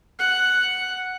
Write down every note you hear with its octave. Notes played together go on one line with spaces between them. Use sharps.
F#5